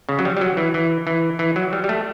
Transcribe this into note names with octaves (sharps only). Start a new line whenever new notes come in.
C#3
F#3
G3
G3
F#3
E3
E3
E3
E3
F#3
G3
G3
A3